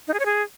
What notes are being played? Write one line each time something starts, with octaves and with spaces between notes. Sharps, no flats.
D#4
G#4
C#5
G#4